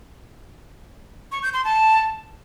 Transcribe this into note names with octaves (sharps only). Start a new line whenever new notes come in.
C#6
G6
C6
A5